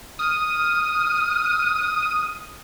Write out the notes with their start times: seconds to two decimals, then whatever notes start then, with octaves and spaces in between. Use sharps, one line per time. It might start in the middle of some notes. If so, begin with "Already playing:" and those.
0.19 D#6 F6